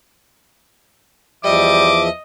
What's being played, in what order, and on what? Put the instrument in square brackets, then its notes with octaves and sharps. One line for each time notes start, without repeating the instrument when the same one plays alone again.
[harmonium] E2 F3 E5 [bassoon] G3 [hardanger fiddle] D#5 [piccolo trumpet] D6